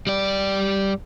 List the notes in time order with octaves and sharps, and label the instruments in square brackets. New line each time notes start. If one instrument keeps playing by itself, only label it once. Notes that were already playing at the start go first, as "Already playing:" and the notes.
[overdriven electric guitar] G3 D5